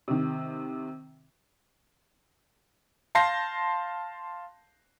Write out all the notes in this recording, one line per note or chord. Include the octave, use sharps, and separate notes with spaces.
C3 D#3
F5 A5 C6 G6 A#6 C7